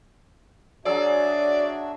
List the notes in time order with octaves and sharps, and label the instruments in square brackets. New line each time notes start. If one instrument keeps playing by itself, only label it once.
[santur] F#3 G#4 E6 [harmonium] D4 F#4 E5 [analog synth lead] D5